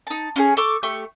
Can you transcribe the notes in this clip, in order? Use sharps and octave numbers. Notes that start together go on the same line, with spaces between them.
D#4 A5
C#4 F4 G#4
A4 C#6 D6
A3 G4 C#6